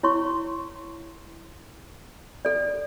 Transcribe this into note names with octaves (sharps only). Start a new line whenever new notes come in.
E4 C#5 C6 C#6
A4 D5